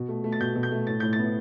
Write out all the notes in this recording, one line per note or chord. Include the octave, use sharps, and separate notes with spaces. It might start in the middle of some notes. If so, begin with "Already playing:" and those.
Already playing: B2
A3
A3
A6
B2 G6
B2
G6
A3
A2 A6
A2 G6
A6
B3